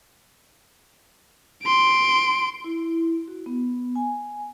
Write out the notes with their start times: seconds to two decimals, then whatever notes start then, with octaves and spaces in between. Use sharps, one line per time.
1.64 C6 D7
2.64 E4
3.28 F#4
3.46 B3
3.96 G#5